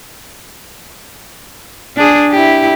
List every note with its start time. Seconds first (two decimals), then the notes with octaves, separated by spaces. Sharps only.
1.97 D4 G#4
2.30 E4 G4